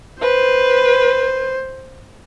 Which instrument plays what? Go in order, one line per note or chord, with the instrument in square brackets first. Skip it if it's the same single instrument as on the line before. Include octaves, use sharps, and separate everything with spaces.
[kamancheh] B4 [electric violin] C5